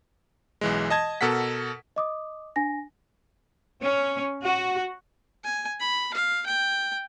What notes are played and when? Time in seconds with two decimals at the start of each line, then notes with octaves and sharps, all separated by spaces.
0.61 B1 E3 G#3
0.90 D#5 A5 G#6
1.21 B2 A4 A#4 F#5 B6
1.96 D#5 D6 D#6
2.56 D4 G#5 A#6
3.83 C#4
4.44 F#4
5.44 G#5
5.80 B5
6.14 F5
6.46 G5